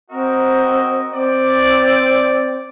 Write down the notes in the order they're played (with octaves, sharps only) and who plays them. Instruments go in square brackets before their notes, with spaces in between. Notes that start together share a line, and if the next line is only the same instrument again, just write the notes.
[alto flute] C4 [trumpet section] F#4 A#4 D#5
[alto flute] C4 [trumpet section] D5